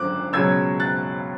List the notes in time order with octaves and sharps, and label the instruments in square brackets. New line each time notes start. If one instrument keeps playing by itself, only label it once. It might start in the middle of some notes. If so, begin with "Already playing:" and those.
Already playing: [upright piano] G#1 F#2 D3 D6 F#6
C#2 B2 F#3 C#4 E6 G#6
F#6 A6